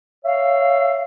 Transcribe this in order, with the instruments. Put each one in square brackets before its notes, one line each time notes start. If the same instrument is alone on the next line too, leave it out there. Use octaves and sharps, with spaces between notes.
[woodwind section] C#5 E5 F5